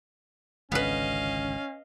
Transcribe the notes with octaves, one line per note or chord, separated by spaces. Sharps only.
G#1 C#2 D3 B3 C#4 B4 D#5 F5